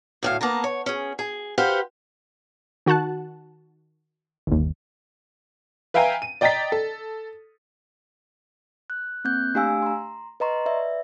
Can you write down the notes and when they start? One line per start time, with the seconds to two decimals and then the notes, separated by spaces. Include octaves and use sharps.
0.23 D2 A2 F5
0.41 A#3 B3 A5 A#5
0.64 C#5
0.86 C#4 G#4
1.19 G#4
1.58 G4 B4 C5 F5 F#5
2.86 D#3 F#4 F#5 A5 F#6
4.47 G1 D#2
5.94 B4 E5 F5 G5 G#5 A#5
6.22 D#7
6.41 D5 D#5 G5 A#5 A6 B6
6.72 A4
8.90 F#6
9.24 A#3 C4 F#6 G6
9.54 A3 D4 G4 F5 G#5 E6
9.82 A#5 C6
10.40 B4 D#5 A#5 C6 C#6
10.66 B4 D5 E5